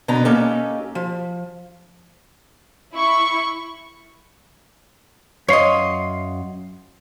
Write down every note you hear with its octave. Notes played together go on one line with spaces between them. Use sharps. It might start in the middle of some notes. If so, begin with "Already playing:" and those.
B2 D3 B3 A#5
A#3 C#4 D#4 G4 A4
F3
E4 C#6
F#2 C#5 D#5 F5 C6